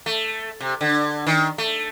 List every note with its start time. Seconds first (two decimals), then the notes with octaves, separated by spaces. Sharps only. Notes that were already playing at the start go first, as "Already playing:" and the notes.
0.06 A3
0.60 C3
0.81 D3
1.27 D#3
1.58 A3